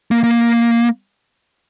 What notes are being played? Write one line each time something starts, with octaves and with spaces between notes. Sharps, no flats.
A#3
A#3